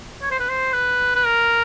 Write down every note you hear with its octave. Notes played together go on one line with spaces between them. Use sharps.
C#5
C5
B4
C5
B4
B4
A#4